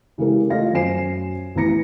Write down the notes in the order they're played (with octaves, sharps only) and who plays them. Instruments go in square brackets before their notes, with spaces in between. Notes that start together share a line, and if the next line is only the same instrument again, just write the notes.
[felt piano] C#3 E3 G#3 E4 G4 A#4
A3 F4 D#5 F5 A#6
F#2 C#4 C5 G#5 C7 E7
A1 E3 B3 A#5 A#6 C#7